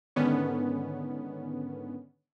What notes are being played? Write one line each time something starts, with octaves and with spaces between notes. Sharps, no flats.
G#2 D3 D#3 B3 C#4